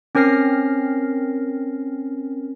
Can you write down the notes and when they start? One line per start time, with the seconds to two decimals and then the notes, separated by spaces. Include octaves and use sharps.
0.15 C4 C#4 A#4 F6 A#6 C7